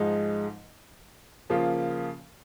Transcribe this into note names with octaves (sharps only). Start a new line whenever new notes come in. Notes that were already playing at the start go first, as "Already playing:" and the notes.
Already playing: G#2 F3 G#3 D#4
C#3 F3 A#3 F4